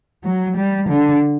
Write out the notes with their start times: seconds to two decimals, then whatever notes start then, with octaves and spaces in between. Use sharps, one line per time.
0.24 F#3
0.56 G3
0.89 D3